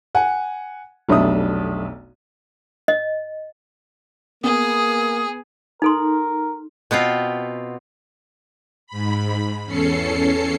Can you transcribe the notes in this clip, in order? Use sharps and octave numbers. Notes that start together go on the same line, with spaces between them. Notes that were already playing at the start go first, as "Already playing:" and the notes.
F#5 G#5
F1 B1 D4 E5 D#6
D#5
A#3 B3 G#4 D#6
D#4 A4 A#4 C6
B2 B3 C4 F4
G#2 B5
E2 C#4 A4 C7 C#7